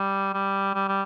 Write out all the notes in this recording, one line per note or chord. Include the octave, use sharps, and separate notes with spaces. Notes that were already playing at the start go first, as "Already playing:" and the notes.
Already playing: G3
G3
G3
G3